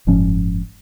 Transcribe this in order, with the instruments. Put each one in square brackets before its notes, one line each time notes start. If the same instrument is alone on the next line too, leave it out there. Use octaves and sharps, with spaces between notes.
[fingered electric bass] F#1 G#2 F3 C#4